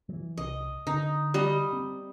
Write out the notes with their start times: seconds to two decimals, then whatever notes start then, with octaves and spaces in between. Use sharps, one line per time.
0.09 E3 F#3
0.37 C2 D#5
0.87 D3 D#4
1.34 G3 D#5
1.73 C4